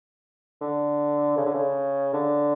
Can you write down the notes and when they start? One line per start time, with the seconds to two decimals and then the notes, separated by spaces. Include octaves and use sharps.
0.61 D3
1.38 C#3
1.46 D3
1.54 C#3
2.13 D3